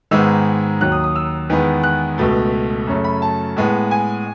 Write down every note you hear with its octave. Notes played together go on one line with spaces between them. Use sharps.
G#2 D#3 G#3 B3 E6
D#2 D#3 F#3 F#6
D#6
D#6
E6
E2 D#3 G#3 B3
F#6
C#2 B2 A3
F#2 C#3 F#3 A3
B5
A5
A2 G#3 B3
G#5